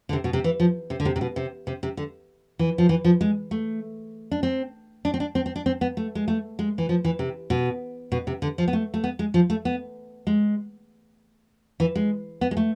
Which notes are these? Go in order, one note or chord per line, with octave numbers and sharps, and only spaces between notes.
D3
C3
B2
C3
E3
F3
C3
D3
C3
C3
B2
C3
C3
C3
D3
E3
F3
E3
F3
G#3
A3
D4
C4
D4
C4
D4
C4
C4
D4
C4
B3
A3
G#3
A3
G#3
E3
F3
E3
C3
B2
B2
C3
D3
F3
B3
A3
A3
B3
G#3
F3
A3
B3
G#3
E3
G#3
B3
G#3
A3